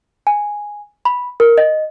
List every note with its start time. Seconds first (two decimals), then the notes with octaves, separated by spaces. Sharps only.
0.27 G#5
1.05 B5
1.40 A#4
1.58 D#5